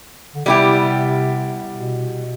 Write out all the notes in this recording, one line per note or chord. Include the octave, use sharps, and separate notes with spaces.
D3
C3 G3 B3 E4 G4
B2